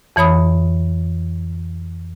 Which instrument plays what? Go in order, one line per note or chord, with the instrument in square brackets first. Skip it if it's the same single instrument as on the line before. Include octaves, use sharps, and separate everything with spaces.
[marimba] F2 E3 C#5 B5 D#6